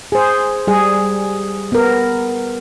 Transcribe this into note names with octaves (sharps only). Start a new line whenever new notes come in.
G#4 C5
G3 G#4
B3 A#4